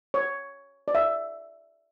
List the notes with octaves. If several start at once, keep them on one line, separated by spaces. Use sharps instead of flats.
C#5
D5
E5